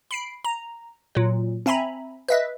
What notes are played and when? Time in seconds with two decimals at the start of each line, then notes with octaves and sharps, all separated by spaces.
0.11 B5 C7 D7
0.45 A#5
1.15 A#2 F#3
1.66 C4 E5 G#5 A#5 B5
2.29 B4 D#5 E5